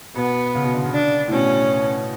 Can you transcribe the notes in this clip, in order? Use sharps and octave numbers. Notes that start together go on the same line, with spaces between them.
B2 B3
C#3
B2
D3
C#3
D4
A2
B2 C#4